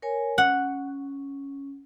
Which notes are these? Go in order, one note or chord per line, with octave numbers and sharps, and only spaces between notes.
A#4 C#5 G#5
C#4 F#5